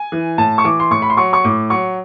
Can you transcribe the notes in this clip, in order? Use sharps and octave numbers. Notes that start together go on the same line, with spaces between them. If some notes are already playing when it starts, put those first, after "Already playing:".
Already playing: G#5
E3
A2 A5
C#6
E3 D6
C6
A2 C#6
B5
C6
F#3 C#6
C#6
A2 D6
F#3 C#6